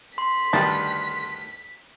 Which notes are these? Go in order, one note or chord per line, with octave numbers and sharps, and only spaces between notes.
C6 B6
D2 G2 D#3 G3 D4